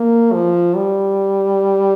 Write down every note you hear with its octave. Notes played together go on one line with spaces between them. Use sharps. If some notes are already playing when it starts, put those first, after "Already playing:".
Already playing: A#3
F3
G3